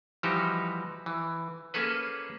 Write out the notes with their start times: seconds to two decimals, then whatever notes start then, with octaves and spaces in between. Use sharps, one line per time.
0.23 E3 F3 G3 D#4 F#4 G4
1.06 E3
1.74 A#3 C#4 G#4 A4 B4